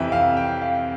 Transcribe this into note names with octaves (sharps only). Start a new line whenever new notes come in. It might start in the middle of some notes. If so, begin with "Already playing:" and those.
Already playing: F2 C3 E3 E5
F5
G5
F5